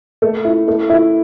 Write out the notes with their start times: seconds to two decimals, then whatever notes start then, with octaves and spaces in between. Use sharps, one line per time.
0.22 A3
0.45 E4
0.68 A3
0.90 E4